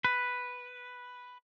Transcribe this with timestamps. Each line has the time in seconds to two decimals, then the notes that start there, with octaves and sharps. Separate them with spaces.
0.05 B4